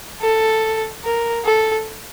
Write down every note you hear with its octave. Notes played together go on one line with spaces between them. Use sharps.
A4
A#4
A4